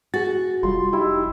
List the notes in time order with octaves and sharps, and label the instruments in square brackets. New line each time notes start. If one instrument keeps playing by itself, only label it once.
[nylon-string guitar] F#4 [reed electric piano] G#4 A6
[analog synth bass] F1 [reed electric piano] G3 F4 [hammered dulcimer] C6
[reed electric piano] D#4 G4 [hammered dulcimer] E4